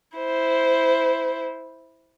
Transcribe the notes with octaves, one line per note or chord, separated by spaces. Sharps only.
E4 C5